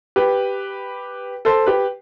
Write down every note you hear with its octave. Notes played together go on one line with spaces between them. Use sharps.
G4 B4
A4 C5
G4 B4